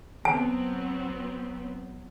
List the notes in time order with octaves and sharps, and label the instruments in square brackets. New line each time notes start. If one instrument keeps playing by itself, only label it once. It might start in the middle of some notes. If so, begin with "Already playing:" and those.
[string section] F#3 B3 C4 [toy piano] A5